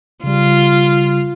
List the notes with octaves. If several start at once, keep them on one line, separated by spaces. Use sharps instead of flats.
C#3 G3 F4